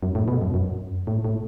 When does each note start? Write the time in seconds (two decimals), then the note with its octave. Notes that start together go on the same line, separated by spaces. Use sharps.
0.03 F#2
0.15 A2
0.28 B2
0.42 F#2
0.54 F#2
1.07 A2
1.24 A2